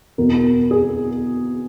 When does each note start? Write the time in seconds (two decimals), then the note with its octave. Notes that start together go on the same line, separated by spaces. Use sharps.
0.18 E2 B2 A#4
0.71 G#4